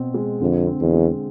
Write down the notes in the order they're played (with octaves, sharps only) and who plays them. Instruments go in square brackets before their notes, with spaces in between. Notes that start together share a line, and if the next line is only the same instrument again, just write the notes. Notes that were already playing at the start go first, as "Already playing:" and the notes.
Already playing: [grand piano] B2 C4
G#3
[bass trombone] F2 [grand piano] D3
[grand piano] C4
[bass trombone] E2
[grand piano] G#3